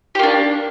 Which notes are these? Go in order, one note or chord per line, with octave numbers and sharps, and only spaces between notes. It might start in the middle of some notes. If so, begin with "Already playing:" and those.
A#3 D4 G4